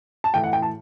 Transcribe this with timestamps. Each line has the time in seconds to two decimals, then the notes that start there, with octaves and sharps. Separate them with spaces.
0.24 A5
0.34 A2 E3 G5
0.44 F#5
0.53 G5
0.62 A5